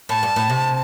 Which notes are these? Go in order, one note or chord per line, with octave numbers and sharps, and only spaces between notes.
A2 A5
G2
A2
C3